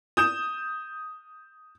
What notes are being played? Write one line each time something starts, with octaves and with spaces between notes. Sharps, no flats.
D#6 G6 E7